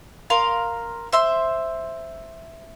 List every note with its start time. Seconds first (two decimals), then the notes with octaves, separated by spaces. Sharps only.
0.30 A#4 F5 C6
1.12 C5 E5 C6